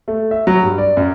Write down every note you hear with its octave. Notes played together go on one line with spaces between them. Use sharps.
A3
E5
F#3
G2
D5
F#2